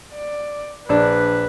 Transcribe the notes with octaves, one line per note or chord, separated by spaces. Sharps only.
D5
A#1 D4 B4